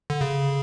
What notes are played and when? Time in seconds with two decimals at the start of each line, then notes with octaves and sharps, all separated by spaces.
0.10 D3
0.21 C#3